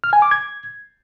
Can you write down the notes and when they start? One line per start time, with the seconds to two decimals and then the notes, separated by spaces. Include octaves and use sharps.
0.04 F6
0.13 G#5
0.22 D6
0.31 G#6